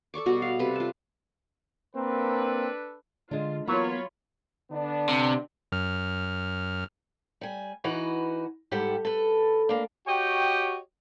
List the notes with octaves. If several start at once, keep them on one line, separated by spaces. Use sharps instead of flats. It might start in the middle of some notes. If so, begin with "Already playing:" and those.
A4 D5 C#6 D6
B2 G3 F#4
F5
C3 G3 A4 B4
F4 A5
A#3 C4 D4 A4 B4
D3 G#3 D4 F4
E3 F#3 A#3 B3 F4 C#5 B5
D3 B3 D4
C3
F#2 F6
G3 G#5
E3 D#4 F#4 B4
G#2 G3 G4 A4 F#5
A4 B4
A#3 D4
F#4 G4 C#5 D#5 G5